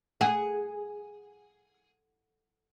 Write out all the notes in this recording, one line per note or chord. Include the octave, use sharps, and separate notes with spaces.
G#4 F#5